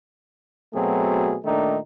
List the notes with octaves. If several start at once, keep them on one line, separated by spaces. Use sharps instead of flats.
B2 F#3 A3 C4 G#4
A#2 D#3 A3 D4 D#4